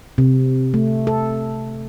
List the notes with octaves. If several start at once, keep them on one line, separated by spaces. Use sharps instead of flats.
C3
A3
A4